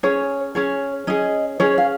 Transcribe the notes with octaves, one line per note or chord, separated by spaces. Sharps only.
C#4 G#4 C#5
C#4 G#4 C#5
C#4 G#4 D#5
C#4 G#4 C#5
F5